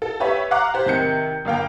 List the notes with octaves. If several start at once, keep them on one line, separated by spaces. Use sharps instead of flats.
A4
G4 B4 C#5 E5
F5 F#5 A#5 C#6 D6 F#6
G4 C5
C3 D#3 G6 C#7
G1 A#3 F5 G5